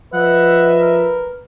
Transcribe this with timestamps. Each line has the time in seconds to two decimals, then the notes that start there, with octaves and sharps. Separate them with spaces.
0.14 F3 B4 D#5 E5 F#5
0.81 A#4